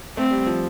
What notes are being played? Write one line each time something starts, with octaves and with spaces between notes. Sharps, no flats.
A3 C4
G3
F3